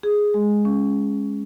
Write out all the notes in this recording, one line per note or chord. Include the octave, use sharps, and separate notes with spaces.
G#4
G#3
C#4